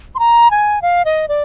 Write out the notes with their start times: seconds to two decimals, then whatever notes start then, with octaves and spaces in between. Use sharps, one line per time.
0.15 C6
0.19 A#5
0.51 G#5
0.82 F5
1.05 D#5
1.28 D5